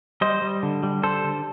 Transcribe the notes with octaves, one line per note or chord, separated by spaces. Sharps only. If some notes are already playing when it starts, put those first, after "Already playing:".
G3 C5 D#5
G3
D3
G3
D3 A4 C5
D3